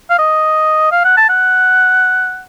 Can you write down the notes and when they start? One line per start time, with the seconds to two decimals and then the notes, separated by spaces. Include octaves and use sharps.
0.10 F5
0.19 D#5
0.92 F5
1.04 F#5
1.17 A5
1.29 F#5